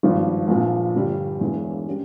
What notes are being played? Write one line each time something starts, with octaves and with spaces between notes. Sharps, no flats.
G#1 G2 F3
A#1 A#2 F3
G1 G2 G3
E1 E2 E3
G3 C#4